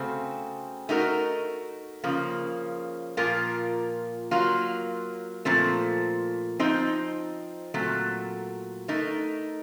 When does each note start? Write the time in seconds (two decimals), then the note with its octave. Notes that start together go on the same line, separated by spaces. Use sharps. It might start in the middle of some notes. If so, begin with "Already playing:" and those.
Already playing: C#3 A3 C4 F#4
0.89 A3 D#4 F#4 A#4
2.04 C#3 F3 A#3
3.17 A#2 F3 A#3 F4 A#4
4.31 F#3 A#3 F4
5.45 A#2 F3 A3 C4
6.60 F3 C4 D#4
7.74 A#2 F#3 A3 C4
8.88 A3 D#4 A#4